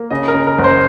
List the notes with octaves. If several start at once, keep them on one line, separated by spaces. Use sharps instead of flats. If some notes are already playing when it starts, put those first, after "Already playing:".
Already playing: A#3
C#3 D#5
A#4
C#3
A#4
F#1
C5